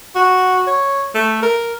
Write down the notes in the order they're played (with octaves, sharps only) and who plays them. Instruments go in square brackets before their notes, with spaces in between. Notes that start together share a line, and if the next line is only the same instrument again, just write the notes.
[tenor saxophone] F#4
C#5
A3
A#4